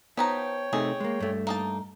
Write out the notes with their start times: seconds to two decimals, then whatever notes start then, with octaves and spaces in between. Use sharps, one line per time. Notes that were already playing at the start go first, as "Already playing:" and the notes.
0.17 F3 B3 D#4 C#5 G5 A#5
0.73 C3 A3 D#4 G#4
1.00 G#3 A#3
1.20 G2 A3
1.47 A#3 D#4 A5